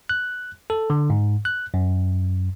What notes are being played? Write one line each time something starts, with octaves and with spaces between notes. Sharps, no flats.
F#6
A4
D3
G#2
F#6
F#2